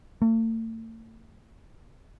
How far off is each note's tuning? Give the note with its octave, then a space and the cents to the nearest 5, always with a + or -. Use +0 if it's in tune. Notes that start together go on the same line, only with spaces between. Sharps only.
A3 +40